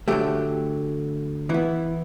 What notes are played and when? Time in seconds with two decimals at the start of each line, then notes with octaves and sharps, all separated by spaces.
0.08 D3 F#3 A3 G4
1.49 E3 B3 E4